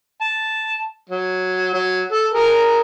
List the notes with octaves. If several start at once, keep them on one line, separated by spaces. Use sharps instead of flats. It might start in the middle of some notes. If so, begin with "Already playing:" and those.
A5
F#3
F#3
A4
G#4 A#4 A#5